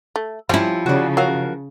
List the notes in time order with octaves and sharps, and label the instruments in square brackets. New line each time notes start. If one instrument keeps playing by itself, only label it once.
[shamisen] A3
[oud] F3 E4 [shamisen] G3 C4 C#4
[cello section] C#3 [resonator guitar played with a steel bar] F#4 D5
[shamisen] F#3 [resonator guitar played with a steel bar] F#4 A#4 F5